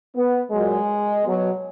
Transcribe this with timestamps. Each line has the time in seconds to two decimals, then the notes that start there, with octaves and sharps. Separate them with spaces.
0.16 B3
0.52 A#2 F#3 G#3
1.24 B2 F#3